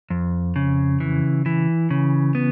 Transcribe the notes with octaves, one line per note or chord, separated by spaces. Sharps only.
F2
C#3
E3
E3
C#3
B3